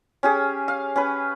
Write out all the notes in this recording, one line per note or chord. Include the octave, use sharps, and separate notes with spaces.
C#4 G4 G#4
F5
C#4 B4